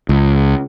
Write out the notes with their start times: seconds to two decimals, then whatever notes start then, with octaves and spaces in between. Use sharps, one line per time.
0.09 C#2